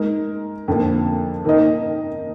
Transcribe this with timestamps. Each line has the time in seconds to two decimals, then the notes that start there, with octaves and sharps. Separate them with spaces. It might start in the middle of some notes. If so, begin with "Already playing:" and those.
Already playing: G#3 D#4 A#4
0.68 F2 D3 F3 A#3
1.45 D#3 A#3 D#4 A#4 D#5